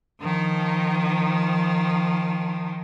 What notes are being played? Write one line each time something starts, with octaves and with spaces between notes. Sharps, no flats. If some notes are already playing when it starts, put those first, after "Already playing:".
D#3 F3